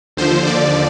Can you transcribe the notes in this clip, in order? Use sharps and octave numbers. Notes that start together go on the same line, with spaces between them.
D#2 D3 F3 C5
D#2 D3 F3 D5